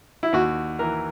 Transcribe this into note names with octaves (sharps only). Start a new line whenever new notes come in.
E4
D#2 F#4
E3 A#4